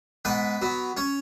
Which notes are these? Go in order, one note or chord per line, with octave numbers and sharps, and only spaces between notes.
G#2 B3 B4
F#3 B3
C#4 C#5